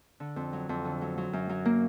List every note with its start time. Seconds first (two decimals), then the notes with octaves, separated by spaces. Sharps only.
0.20 D3
0.36 F2
0.53 F#3
0.69 F2
0.85 D3
1.01 F#3
1.18 F#3
1.33 F#2
1.49 F#3
1.65 A#3